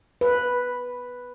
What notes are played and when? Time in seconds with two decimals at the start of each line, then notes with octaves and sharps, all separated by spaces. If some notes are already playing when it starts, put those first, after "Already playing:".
0.21 B4